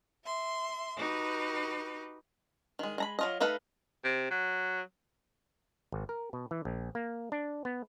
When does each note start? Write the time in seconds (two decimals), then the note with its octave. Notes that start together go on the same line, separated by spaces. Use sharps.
0.23 E5 C6
0.98 D#4 F#4 G4 B4
2.79 D#3 G#3
2.98 G#3 A#5 B5
3.19 F#3 F4 D#5
3.40 A3 D#4 A4 B4 F5
4.04 C3
4.31 F#3
5.92 G#1
6.09 A#4
6.33 B2
6.51 E3
6.65 A#1
6.95 A#3
7.32 D4
7.65 B3